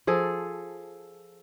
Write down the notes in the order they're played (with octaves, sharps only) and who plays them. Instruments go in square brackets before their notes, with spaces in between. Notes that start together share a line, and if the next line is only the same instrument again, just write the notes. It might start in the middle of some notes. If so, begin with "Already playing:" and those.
[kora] F3 G#4 A4